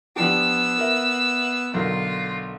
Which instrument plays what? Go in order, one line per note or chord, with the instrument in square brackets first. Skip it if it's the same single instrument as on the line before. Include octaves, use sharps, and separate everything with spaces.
[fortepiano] F3 D4 G4 [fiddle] B3 E6
[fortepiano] A#4 E5
[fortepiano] B1 D3 A#4 [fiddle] F4